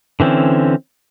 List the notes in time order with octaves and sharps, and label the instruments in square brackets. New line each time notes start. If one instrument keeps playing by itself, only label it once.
[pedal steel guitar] D3 E3 C4 C#4